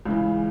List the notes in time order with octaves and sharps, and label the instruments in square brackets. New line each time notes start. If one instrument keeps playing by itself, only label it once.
[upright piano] C#2 C#3 E3